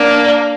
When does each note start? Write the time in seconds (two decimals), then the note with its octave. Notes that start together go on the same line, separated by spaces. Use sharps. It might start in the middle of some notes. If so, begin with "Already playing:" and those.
Already playing: A#3 D4